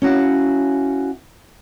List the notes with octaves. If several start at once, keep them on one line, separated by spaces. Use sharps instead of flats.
C#4 E4 F#4 F5